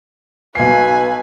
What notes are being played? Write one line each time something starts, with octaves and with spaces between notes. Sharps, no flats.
B1 B4 G#5 C7